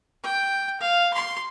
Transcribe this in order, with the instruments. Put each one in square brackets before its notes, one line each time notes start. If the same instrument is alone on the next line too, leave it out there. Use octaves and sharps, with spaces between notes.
[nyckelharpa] G5
F5
C6